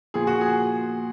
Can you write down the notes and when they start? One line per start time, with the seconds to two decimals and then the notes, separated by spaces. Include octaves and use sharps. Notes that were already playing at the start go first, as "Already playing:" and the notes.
0.14 A#2 F3 G#4
0.27 F#4
0.41 G#4